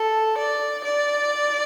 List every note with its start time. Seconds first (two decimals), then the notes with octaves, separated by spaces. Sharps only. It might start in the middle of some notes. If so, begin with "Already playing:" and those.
Already playing: A4
0.38 D5
0.84 D5